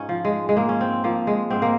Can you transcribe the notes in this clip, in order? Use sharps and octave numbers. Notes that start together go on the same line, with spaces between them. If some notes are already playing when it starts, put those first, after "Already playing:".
Already playing: G#2 C#4 D#4 F4
F3
G#3
G#3
G#2 A#3
C#4
C4
F3 A#3
G#3
G#2 C4
A#3